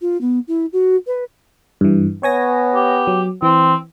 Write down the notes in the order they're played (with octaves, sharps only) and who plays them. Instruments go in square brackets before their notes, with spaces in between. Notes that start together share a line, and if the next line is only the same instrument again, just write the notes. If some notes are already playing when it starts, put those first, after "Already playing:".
[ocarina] F4
B3
E4
F#4
B4
[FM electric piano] G2 E3
[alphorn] B3 [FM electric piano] C#5 G#5 A#6
[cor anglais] G4
[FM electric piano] F#3
[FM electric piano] E3 [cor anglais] C4